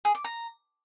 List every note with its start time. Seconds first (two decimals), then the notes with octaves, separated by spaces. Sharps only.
0.05 G#4
0.15 D6
0.24 A#5